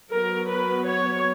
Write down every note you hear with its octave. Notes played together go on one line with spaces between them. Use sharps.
F#3 B3 A#4
B4
C#5